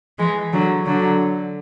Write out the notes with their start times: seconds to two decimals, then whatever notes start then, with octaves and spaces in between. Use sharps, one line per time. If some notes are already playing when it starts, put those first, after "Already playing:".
0.19 E3 G#3
0.52 D3 F#3
0.86 D3 F#3